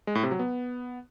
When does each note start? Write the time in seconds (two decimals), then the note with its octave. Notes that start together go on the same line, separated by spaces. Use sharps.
0.07 G#3
0.15 A2
0.23 C3
0.31 F#3
0.39 B3